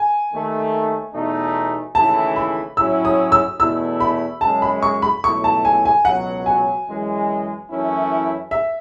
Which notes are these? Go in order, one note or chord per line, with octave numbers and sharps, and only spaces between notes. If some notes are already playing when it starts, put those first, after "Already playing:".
Already playing: G#5
D#2 D#3 A3
E2 B2 A3 D#4
D#2 C#3 E3 A3 E4 A5
B5
A2 F#3 C#4 E4 E6
D#6
E6
E2 B2 A3 E4 E6
B5
F#2 C#3 G#3 A5
B5
C#6
B5
C#2 B2 F#3 A3 E4 C#6
A5
G#5
G#5
C#2 B2 F#3 F#5
G#5
F#2 E3 G#3
F#2 E3 A3 C#4 E4
E5